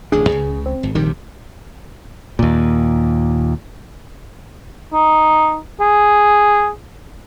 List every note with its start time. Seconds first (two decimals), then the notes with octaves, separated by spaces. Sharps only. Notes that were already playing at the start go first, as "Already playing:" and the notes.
0.12 D1 A1 D4 G#4
0.28 C#2 C#3
0.66 C4
0.83 G#1
0.95 A#1 C3 D#3 G3
2.39 D#2 A#2
4.93 D#4
5.81 G#4